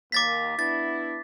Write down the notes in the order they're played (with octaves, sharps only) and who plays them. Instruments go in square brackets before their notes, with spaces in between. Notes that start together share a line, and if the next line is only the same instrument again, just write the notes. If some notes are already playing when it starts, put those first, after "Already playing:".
[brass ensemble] D#2 A#3 [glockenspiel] D6 A6 B6
[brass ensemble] B3 D4 E4 [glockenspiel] A6